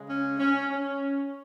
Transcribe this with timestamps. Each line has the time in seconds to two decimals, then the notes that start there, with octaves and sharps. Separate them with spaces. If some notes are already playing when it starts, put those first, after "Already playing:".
Already playing: C#3 G#3
0.09 C#4
0.39 C#4
0.70 C#4